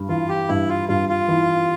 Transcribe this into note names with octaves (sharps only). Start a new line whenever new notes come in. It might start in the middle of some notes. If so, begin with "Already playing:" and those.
Already playing: G2
E3 F4
G4
G2 E4
F4
G2 F4
F4
E3